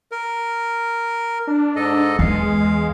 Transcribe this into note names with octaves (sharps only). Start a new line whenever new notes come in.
A#4
D4
G#2 A4 D#5
E2 G#3 F5